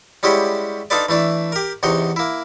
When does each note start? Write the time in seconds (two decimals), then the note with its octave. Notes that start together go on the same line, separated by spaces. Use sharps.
0.23 G3 G#3 C#4 E4 F#4 G4
0.90 D4 D#4 F4 A4 B4 D5
1.09 E3 A3 D4 E4
1.52 G4 A#4
1.83 E2 C3 D#4 F#4 C6
2.16 A#3 E4